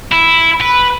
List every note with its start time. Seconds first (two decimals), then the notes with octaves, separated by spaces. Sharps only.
0.12 E4
0.61 B4